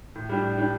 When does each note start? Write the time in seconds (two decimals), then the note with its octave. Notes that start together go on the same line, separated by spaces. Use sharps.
0.15 A2
0.29 G3 D4 G4
0.43 A2
0.57 G3 D4 G4